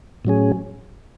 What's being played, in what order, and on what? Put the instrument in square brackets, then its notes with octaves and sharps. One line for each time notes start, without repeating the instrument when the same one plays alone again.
[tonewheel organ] A2 F#3 C#4 G#4